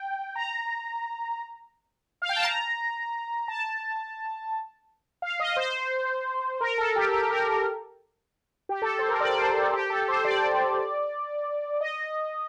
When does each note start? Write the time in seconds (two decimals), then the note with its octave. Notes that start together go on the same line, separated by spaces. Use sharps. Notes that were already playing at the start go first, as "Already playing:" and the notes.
Already playing: G5
0.35 A#5
2.22 F5
2.29 G5
2.36 A5
2.44 A#5
3.48 A5
5.22 F5
5.40 D#5
5.56 C5
6.61 A#4
6.78 A4
6.96 G4
7.13 G4
7.30 A#4
7.47 A#4
8.69 G4
8.82 A4
8.99 C5
9.09 A#4
9.20 D5
9.38 C5
9.55 A4
9.73 G4
9.90 A4
10.08 C5
10.25 D5
11.81 D#5